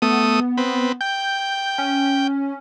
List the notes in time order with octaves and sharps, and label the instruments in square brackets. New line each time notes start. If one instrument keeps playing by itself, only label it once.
[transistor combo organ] A3 D#6 [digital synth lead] B3
[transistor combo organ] C4 B4
[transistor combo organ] G5 [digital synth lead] G6
[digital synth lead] C#4